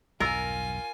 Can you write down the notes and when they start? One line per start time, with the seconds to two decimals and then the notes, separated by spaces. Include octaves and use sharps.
0.20 B1 E2 G2 F4 A#4 D#5 G#5 E6